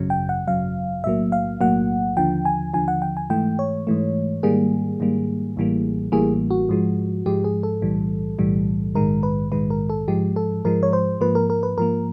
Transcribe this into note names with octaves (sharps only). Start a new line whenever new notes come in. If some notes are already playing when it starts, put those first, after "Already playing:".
Already playing: G#1 F#2 C#3 F#3
G5
F#5
G#1 F#2 C#3 F#3 F5
B1 A2 F#3 A#3 E5
F5
B1 A2 F#3 A#3 F#5
D#2 D3 F3 G5
G#5
D#2 D3 F3 G#5
F#5
G5
G#5
G#2 E3 A3 G5
C#5
G#2 E3 A3
G#2 D#3 G3 A#3 G#4
G#2 D#3 G3 A#3
A1 A2 E3 G3 A#3
A1 A2 E3 G3 A#3 G#4
F#4
G#2 F3 G#3
G#2 F3 G#3 G4
G#4
A4
B1 A2 E3 G3
B1 A2 E3 G3
A#1 G#2 D#3 G#3 A#4
B4
A#1 G#2 D#3 G#3 B4
A#4
A4
G#2 F3 G#3 G4
A4
G#2 F3 G#3 A#4
C#5
C5
G#2 F3 A#3 B4
A#4
A#4
B4
G#2 F3 A#3 A#4